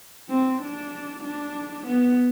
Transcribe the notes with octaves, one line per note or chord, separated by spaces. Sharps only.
C4
D4
D4
B3